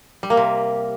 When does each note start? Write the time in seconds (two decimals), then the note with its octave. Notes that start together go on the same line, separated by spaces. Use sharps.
0.23 G3
0.30 A#3
0.37 C3